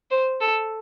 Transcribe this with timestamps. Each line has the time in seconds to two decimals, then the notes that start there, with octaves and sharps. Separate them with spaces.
0.11 C5
0.41 A4